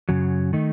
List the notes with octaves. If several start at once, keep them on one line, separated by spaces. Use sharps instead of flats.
F#2 C#3 F#3
D#3 A3 D#4